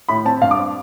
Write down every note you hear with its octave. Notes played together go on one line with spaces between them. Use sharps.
A2 B5
C4 A5
G2 F5
D6
C4